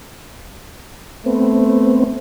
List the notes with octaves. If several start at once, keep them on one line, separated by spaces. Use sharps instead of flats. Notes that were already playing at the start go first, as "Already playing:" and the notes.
A3 B3 C4